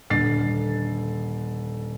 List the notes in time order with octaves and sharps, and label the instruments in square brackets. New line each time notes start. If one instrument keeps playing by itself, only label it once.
[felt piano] D#1 D3 A6 C7